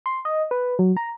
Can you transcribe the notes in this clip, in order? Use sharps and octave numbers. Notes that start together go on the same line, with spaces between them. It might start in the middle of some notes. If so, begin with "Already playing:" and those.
C6
D#5
B4
F#3
A#5